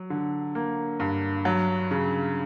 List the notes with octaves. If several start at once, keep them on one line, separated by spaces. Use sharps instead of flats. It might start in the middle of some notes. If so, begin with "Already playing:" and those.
Already playing: F#3
D3
A#3
G2
F#3
C#3